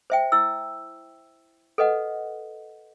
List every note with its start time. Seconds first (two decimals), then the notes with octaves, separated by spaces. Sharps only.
0.10 C5 E5 G5
0.32 E4 E6
1.78 A4 B4 D#5 F#5